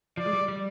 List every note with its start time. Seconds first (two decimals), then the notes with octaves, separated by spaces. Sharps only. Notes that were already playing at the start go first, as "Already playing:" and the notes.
0.17 F3 D5
0.26 G#3
0.33 G3
0.48 G3